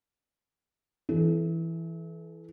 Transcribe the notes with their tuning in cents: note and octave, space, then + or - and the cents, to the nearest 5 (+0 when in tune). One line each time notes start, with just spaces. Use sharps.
E3 +0 A4 -40